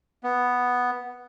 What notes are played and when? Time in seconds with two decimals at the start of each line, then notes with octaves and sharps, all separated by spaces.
0.24 B3